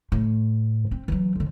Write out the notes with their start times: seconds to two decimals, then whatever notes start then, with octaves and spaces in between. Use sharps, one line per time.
0.12 A2
0.91 C4
1.08 E3 F#3
1.36 F2 D3